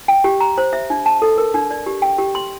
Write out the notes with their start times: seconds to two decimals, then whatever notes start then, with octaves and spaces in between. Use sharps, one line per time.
0.08 G5
0.24 G4
0.40 A#5
0.58 C5
0.73 E5
0.90 D4
1.06 A5
1.22 A4
1.38 A#4
1.54 D4
1.71 D5
1.86 G4
2.02 G5
2.18 G4
2.35 C6